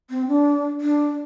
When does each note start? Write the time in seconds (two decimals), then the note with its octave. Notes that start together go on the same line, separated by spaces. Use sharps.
0.10 C4
0.28 D4
0.81 D4